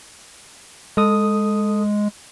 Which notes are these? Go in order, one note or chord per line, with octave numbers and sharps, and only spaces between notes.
G#3 A4 D#6